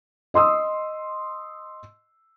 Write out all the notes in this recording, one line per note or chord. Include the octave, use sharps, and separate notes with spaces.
D#5 C6 D#6 E6